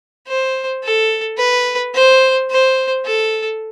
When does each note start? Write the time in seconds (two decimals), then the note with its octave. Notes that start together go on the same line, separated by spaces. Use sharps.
0.27 C5
0.84 A4
1.38 B4
1.94 C5
2.50 C5
3.06 A4